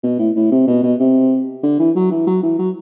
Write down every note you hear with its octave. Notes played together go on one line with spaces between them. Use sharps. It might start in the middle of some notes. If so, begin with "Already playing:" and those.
B2
A2
A2
C3
B2
B2
C3
D3
E3
F#3
E3
F#3
E3
F#3